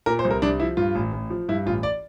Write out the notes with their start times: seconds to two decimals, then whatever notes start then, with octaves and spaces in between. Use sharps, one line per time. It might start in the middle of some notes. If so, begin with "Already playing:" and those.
0.06 A#2 A#4
0.19 C5
0.25 C2
0.30 A#4
0.42 C2 D4
0.60 F3 E4
0.77 G2 F4
0.95 A1
1.13 A1
1.30 F3
1.49 G2 E4
1.65 A1 F4
1.83 D5